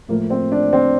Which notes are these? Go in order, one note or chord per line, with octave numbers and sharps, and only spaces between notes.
A2 F3 A3 A#3
C4
D4
C4